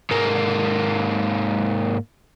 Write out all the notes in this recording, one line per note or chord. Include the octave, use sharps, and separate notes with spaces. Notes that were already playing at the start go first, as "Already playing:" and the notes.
G#2 A#3